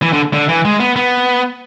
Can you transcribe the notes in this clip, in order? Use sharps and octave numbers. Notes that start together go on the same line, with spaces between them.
E3
D3
D3
E3
G#3
B3
B3